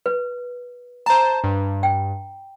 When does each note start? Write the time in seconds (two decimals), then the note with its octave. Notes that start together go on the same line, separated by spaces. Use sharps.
0.06 B4
1.06 C5 A5 A#5
1.44 G2
1.83 G5